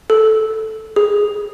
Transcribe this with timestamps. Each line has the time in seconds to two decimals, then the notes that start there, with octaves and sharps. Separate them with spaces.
0.10 A4
0.96 G#4